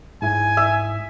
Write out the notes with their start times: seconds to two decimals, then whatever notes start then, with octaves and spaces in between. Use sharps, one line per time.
0.22 G#2 E4 G#5
0.57 E5